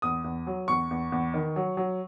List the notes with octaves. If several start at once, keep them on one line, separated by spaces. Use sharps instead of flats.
E2 D#6
E2
F#3
E2 C#6
E2
E2
D#3
F#3
F#3